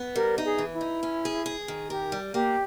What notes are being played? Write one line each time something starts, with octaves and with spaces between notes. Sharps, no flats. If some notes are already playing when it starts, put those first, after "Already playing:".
Already playing: B3
G3 A#4
D#4
G#4
E3
E4
D#4
C#4
G#4
G#4
D#3
G4 A#4
G3
A#3 G4